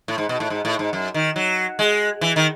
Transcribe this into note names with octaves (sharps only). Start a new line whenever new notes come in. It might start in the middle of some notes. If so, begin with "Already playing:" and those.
A2
G#2
B2
A2
G#2
A2
G#2
F#2
D#3
F#3
G#3
E3
D#3